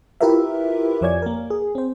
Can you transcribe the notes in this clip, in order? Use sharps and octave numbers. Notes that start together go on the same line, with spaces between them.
E4 F4 G4 A#4 B4 E5
F2 F3 C#5 D5 G#5 G#6
A#3 A#4
G#4
C4 C5